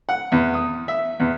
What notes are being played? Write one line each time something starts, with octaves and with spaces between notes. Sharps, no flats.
F#5
E2
D#6
E5
E2